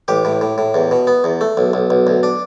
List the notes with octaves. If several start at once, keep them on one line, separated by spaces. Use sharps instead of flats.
A1 G4
A2
A2
A2
E2
B2
B3
E2
A3
B1
B1
B1
D2
D4